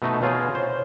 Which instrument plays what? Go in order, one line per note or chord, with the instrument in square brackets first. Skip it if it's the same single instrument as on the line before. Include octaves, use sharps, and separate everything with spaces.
[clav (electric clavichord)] B2 A3 D#4
[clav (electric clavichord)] B2 F4 G#4 [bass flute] C#5
[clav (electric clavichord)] C5